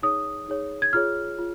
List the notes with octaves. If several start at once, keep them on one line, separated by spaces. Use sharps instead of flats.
D#4 G#4 C#5 D#6
D#4 G#4 C#5
G#6
F4 G#4 C#5 F6
F4